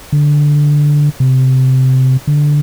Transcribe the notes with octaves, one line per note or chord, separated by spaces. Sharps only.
D3
C3
D3